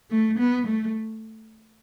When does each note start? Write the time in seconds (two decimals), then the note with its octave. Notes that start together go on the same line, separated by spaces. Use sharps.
0.10 A3
0.38 B3
0.67 A3